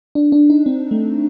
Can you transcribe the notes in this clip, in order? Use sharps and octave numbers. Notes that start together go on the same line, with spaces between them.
D4
D4
D#4
C4
A3